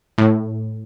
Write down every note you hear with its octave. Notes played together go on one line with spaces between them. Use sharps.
A2